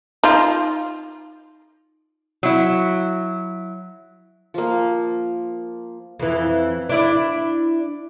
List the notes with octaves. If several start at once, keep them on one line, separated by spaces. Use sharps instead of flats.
D#4 F4
F#3 E4
F3 A#3
F2 E3
D4 E4 D5